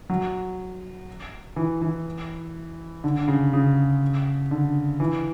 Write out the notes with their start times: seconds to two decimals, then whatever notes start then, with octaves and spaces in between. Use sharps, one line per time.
0.10 F#3
1.56 E3
1.81 E3
3.04 D3
3.28 C#3
3.53 C#3
4.51 D3
5.00 E3